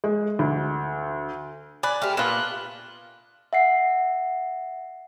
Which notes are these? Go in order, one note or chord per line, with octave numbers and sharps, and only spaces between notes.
G#3
D2
D5 G#5 B5 F#6
C3 A3 F6
A#2 A3 B3 F4 F#6 E7
E5 F#5 C7